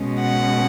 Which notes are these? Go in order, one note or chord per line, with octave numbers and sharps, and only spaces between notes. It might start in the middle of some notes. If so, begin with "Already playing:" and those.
Already playing: B2 G#3 C#4
F#5